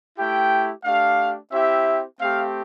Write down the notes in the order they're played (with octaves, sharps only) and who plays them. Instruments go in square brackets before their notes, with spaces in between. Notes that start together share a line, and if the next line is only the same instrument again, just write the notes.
[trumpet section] A3 E4 G4 G5
A3 D4 G4 F5
C4 E4 G4 E5
A3 C4 G4 F5